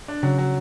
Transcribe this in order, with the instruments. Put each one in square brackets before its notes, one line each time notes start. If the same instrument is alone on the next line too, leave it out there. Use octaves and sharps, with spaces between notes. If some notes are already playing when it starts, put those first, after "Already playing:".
[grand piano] D4
[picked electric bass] C#3 [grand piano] F#3
[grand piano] F#3